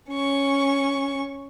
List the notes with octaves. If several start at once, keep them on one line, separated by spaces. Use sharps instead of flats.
C#4 C#6